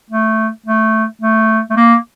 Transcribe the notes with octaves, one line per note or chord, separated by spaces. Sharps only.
A3
A3
A3
A3
A#3